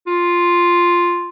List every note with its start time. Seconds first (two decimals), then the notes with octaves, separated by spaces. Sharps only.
0.07 F4